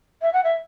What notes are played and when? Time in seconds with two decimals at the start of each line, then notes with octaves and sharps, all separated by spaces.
0.22 E5
0.33 F#5
0.44 E5